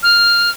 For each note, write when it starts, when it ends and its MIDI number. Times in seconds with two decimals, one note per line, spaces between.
0.03 0.50 89